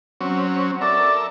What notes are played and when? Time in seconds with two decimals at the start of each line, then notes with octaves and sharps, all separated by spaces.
0.21 F#3 C4 C#4
0.81 A4 A#4 D5 E5